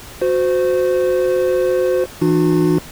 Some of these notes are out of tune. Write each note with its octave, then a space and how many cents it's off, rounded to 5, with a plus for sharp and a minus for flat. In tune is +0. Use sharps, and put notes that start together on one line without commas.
F#4 -15 C5 -25
E3 +0 D4 +40 F#4 -35